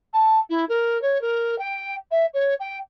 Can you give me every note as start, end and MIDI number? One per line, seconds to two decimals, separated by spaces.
0.13 0.39 81
0.49 0.65 64
0.69 1.00 70
1.02 1.21 73
1.21 1.58 70
1.58 1.95 79
2.11 2.26 76
2.34 2.54 73
2.60 2.78 79